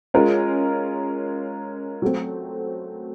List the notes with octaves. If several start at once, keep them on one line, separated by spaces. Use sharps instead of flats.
G#3 C#4 F4 A#4
F#3 A3 C4